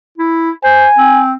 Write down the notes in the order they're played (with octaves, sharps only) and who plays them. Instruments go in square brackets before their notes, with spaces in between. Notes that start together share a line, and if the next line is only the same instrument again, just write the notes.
[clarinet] E4
[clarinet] C5 [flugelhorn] G#5
[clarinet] C4